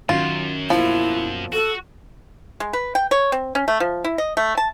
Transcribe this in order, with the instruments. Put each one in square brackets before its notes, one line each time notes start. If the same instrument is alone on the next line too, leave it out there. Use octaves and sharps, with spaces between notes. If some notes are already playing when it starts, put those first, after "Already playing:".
[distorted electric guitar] F#2 [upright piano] D#3 F#3 C#4 [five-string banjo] F4
[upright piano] B2 A#3 [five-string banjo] F3 [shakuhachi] E4
[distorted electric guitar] F#4 [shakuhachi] A4
[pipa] G#3
B4
G5
C#5
C4
C#4
A3
F3
E4
D#5
A3
A5